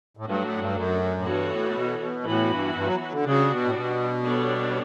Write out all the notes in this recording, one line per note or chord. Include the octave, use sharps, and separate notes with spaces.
A2
G2 F#3 A3 D4 F#4
A2
G2
F#2
A2
G2 E3 B3 F#4 A4 C#5
A2
B2
B2
A2 E3 B3 F#4
G2
G2
F#3
F#3
D3
C#3 G3 D4 F#4
B2
A2
B2
G3 B3 D4 A4 C#5